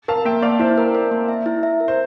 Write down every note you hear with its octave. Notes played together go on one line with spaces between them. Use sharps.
A#4 F5 A5
A#3 E5 G5
A#3 D5 F5
E4 C5 E5
A#4
A#4
A#3
E5
E4
E5
A#4
C5